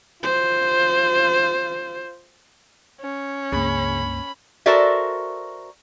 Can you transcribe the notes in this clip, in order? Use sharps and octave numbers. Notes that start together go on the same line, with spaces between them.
F4 C5
C#4
C#2 G2 C#3 A#3 B5
F#4 A4 A#4 C5 D5 E5